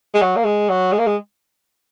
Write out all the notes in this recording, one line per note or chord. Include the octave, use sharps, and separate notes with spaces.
G#3
F#3
A#3
G#3
F#3
G#3
A#3
G#3